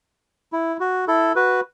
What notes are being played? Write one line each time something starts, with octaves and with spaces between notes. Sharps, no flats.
E4
F#4
E4 A4
F#4 B4